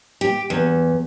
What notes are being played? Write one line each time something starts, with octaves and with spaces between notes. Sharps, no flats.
G4
E2